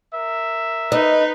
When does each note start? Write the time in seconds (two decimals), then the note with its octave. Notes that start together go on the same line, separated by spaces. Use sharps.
0.14 A#4 E5
0.92 D#4 B4 D#5